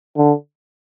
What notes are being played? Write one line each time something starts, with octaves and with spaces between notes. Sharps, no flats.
D3